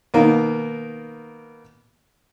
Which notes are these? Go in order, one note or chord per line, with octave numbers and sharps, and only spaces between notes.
B2 D#3 A#3